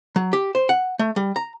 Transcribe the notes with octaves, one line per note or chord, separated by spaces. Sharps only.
F#3
G4
C5
F#5
A3
G3
A#5